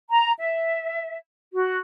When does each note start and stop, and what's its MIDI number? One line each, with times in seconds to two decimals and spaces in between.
0.09 0.32 82
0.40 1.15 76
1.52 1.77 66